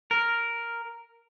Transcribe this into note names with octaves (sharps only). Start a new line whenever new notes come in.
A#4